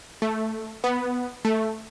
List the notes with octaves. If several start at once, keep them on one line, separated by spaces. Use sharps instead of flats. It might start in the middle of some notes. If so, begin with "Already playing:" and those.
A3
B3
A3